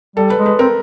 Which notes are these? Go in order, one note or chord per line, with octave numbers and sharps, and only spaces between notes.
G3 A4
B4
G#3
B4
C4 A#4